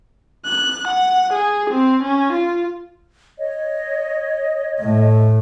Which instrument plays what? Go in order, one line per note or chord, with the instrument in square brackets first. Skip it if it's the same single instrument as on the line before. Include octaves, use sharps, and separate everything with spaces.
[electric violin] F#6
F#5
G#4
C4
C#4
F4
[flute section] C#5 D#5
[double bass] A2 A3